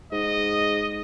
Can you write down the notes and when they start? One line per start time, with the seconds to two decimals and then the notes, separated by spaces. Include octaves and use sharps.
0.12 G#2 D#5